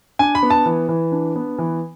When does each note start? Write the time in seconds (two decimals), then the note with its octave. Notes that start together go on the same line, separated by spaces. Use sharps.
0.19 D4 G#5
0.35 B5
0.43 B3
0.50 A5
0.66 E3
0.89 E3
1.12 D4
1.36 B3
1.58 E3